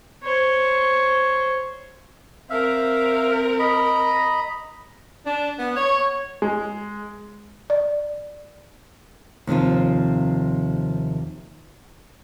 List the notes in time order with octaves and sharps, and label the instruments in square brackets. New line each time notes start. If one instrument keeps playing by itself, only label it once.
[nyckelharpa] C5 C#5
[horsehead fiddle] C4 A#4 [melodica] E5 F5
[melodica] D#5 A#5 B5
[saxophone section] D4
B3
C#5
[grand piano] G#3
[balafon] D5
[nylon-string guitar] D#2 C3 F3 F4